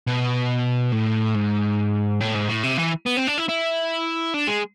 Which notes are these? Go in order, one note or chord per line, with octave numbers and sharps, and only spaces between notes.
B2
A2
G#2
A2
G#2
A2
C3
E3
B3
C4
D4
E4
E4
D4
G#3